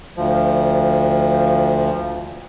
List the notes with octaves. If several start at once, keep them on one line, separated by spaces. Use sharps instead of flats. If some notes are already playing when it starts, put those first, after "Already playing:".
D2 F3